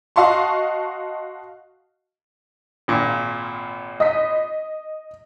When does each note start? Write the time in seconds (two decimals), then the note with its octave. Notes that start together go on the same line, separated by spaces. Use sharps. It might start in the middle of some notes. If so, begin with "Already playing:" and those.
0.16 F#4 D#5 F5 A5 C6 C#6
2.88 G#1 A#2
4.00 D#5 D#6 B6